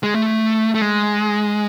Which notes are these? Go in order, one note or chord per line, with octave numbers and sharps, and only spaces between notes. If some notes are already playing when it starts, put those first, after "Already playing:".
G#3
A3
A3
G#3